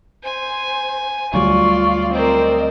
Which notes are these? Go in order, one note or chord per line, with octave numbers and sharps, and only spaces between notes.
C5 G#5
D2 F#3 G3 F4 D5 C#6
C4 A#4 C5 D5 D#5